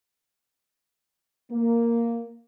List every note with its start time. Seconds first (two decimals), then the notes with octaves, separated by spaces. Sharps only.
1.52 A#3